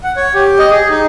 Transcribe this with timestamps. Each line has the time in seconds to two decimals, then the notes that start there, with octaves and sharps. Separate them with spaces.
0.04 F#5
0.16 C#5
0.34 G4
0.59 D#5
0.71 G#4
0.90 D#4